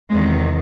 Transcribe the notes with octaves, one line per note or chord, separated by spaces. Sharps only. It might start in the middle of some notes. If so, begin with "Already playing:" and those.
E2 C3 D#3 G#3